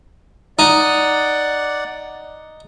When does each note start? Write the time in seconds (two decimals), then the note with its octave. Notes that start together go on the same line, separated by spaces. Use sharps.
0.59 D#4 D5 F#5